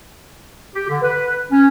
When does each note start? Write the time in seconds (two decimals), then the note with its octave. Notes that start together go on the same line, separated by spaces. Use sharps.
0.75 G4
0.88 D3
1.02 B4
1.51 C#4